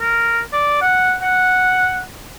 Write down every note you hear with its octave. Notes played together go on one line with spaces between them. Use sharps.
A#4
D5
F#5
F#5